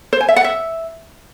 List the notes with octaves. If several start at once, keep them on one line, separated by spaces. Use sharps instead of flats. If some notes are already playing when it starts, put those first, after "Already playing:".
C5
G#5
E5
F#5
E5